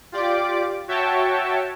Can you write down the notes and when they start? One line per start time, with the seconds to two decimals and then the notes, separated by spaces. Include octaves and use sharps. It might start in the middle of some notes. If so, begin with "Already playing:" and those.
0.12 F4 G4 D5 D6
0.88 F#4 C#5 E5 G5 A5